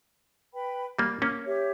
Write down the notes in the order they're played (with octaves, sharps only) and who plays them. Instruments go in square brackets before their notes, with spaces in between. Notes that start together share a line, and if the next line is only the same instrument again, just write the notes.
[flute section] B4 G5 B5
[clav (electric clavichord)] G3 A#3
A#3 C#4
[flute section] G4 C#5 E5